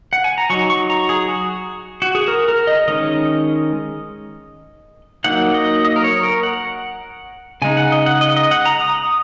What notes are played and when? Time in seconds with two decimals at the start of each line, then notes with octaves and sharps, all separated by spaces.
0.13 F#5
0.24 G#5
0.38 A#5
0.50 F#3 D#4 C#6
0.70 C#6
0.90 A#5
1.09 G#4
1.29 F#4
2.02 F#4
2.15 G#4
2.28 A#4
2.48 A#4
2.67 D#5
2.88 D#3 G#3 C#4 D#5
5.24 F#3 A#3 D#4 F#5
5.54 D#5
5.85 D#5
5.96 A#4
6.04 C#5
6.23 A#4
6.43 F#5
7.62 C#3 G#3 D#4 G#5
7.77 F#5
7.92 D#5
8.06 F#5
8.21 D#5
8.37 D#5
8.51 F#5
8.66 A#5
8.80 D#6